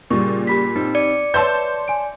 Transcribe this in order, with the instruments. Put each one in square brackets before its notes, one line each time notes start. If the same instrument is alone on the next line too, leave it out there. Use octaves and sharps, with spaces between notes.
[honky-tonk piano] A#2 [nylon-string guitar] C#3 G3 [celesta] C#6
[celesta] G4 B5 B6
[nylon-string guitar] C4 [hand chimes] D#4
[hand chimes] D5 C#7
[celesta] B4 [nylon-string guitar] C#5 E5 [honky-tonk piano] A5 C6 G6
[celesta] G#5 D7